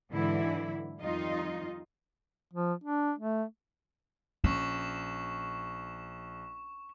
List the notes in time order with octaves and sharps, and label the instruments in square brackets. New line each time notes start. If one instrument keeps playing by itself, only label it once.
[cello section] G#2 D3 E3 F#3 E4
F2 D#3 G3 D#4 F4 D#5
[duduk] F3
D4
A3
[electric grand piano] A#1 [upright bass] C#4 [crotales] C#6 E7